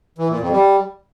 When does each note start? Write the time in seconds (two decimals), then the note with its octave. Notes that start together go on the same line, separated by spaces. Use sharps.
0.18 E3
0.29 A#2
0.41 F2
0.52 G3